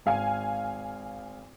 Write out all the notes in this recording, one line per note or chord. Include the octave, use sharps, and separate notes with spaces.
G#1 F5 G#5